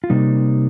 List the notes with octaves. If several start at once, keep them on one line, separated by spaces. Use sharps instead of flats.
F4
C3 G3 A#3 D#4